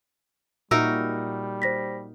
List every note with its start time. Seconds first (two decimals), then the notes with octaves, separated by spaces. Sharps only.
0.71 A#2 G3 D#4 F#4 A#4 E5 E6
1.62 C5 A#6 B6